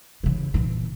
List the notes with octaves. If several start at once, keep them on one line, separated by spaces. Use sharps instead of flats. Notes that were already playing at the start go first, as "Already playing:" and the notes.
C#3 E3
A#2 E3